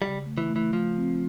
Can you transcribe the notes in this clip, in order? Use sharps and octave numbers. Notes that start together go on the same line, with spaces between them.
C#3 G3
A3
E3
A3
E3
F3 A3
C4